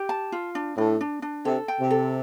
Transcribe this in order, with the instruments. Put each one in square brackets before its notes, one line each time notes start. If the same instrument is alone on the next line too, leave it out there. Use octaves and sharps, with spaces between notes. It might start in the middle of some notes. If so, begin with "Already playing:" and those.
Already playing: [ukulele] G4
A5
F4
D4
[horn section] A2 [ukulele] D4
[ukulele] D4
D4
[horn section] C3 [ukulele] A4
[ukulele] G5
[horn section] C3
[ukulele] A4